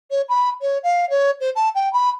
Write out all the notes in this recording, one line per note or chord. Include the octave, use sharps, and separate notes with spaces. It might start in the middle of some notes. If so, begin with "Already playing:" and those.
C#5
B5
C#5
F5
C#5
C5
A5
G5
B5